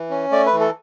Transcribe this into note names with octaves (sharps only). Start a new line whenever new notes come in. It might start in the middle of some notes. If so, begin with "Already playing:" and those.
Already playing: E3
C#4
A3 D5
B4
E3
A4